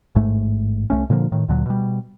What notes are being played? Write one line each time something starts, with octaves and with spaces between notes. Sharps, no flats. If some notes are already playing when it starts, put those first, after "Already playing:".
A1 G#2 A3
C2 F2 A3 C#4
A#2 D3 F3 A#3
A2 D#3
D2 A#2 D3 F#3
B2 G3